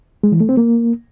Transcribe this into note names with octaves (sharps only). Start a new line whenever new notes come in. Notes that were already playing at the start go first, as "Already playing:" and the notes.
G#3
E3
A3
C4
A#3